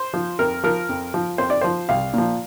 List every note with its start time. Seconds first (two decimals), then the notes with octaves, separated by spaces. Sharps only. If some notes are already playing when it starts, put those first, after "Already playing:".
Already playing: C5
0.14 F3
0.39 F2 A#4
0.64 F3 A#4
0.89 F2
1.14 F3
1.38 F2 C5
1.50 D5
1.61 F3 C5
1.89 C2 F5
2.13 A#2 F3